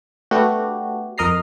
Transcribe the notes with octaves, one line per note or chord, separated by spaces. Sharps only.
A3 B3 D4 F#4 G4
F2 A#4 D#5 A#5 C7